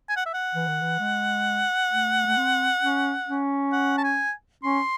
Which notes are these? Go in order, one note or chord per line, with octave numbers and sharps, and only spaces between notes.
G#5
F#5
E5
F#5
E3
D#3
E3
G#3
A3
A3
C4
C#4
C#4
F#5
A5
G#5
C#4 C6